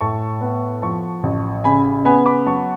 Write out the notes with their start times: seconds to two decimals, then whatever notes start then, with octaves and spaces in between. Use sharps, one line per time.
0.01 A2 A5 C#6
0.41 B3
0.82 F3 A5 C#6
1.23 A1
1.64 C#3 G#5 B5
2.05 B3 G#5 B5
2.26 B5 D6
2.46 F#3 A5 C#6